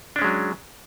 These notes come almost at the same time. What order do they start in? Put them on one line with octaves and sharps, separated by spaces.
D4 C#4 G#3 F#3